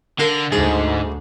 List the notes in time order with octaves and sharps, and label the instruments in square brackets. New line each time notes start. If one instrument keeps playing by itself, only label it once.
[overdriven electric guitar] D3 [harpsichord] A#4 F5
[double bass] D2 [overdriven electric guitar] G#2 [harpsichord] G#4